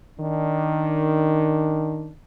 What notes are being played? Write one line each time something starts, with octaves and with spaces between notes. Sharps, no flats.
D#3 D4